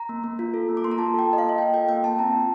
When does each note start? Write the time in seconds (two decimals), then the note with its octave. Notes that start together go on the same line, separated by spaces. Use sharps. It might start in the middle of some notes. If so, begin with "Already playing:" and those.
Already playing: A#5
0.09 A#3
0.24 A#3
0.39 F4
0.54 A4
0.69 A#3
0.77 D6
0.84 A#3 C6
0.91 A#5
0.98 F4 A5
1.14 A4
1.19 G5
1.29 A#3 D#5
1.38 F5
1.44 A#3
1.49 F5
1.58 F4 G5
1.74 A4 G5
1.89 A#3 G5
2.03 A#3 A5
2.19 C4 A#5
2.33 F4